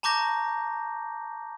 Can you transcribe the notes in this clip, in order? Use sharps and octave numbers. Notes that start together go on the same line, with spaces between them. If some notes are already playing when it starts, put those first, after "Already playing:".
A5 A#5 C#6 D6 G6 A#6